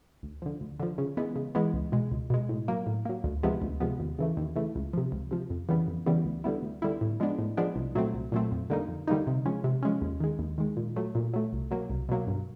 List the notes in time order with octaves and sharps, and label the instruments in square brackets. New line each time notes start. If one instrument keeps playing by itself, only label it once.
[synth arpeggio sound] D2
D3 F3
D2
D3 F3
C#3
E3 G#3 B3
C#3
E3 G#3 B3
C#2
B2 G#3
C#2
B2 G#3
A2
F#3 A#3
A2
F#3 A#3
D2
C3 F3 G#3 B3
D2
C3 F3 G#3 B3
D#2
C#3 E3 A3
D#2
C#3 E3 A3
C#2
C3 F3
C#2
C3 F3
F2
C#3 E3 G3 B3
F2
C#3 E3 G3 B3
D2
D3 G3 B3 E4
D2
D3 G3 B3 E4
A2
F3 G#3 B3 D4
A2
F3 G#3 B3 D4
C2
A#2 F#3 A3 C4
C2
A#2 F#3 A3 C4
F2
D3 G3 A#3 D#4
F2
D3 G3 A#3 D#4
C3
F3 G#3 C#4
C3
F3 G#3 C#4
D#2
D#3 G#3
D#2
D#3 G#3
A#2
F#3 A3
A#2
F#3 A3
C2
B2 F#3 A#3
C2
B2 F#3 A#3
G2